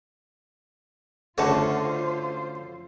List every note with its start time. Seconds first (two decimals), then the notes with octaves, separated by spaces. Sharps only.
1.38 D3 A3 C#4 F4 F#4 C5 A5